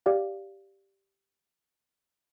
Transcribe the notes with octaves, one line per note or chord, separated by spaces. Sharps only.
G4 D5 F5